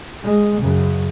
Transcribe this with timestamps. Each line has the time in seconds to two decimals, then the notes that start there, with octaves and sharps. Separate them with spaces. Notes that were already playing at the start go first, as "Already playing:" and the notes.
0.23 G#3
0.62 F#2 C#3